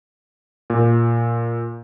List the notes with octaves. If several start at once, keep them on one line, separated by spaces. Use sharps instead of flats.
A#2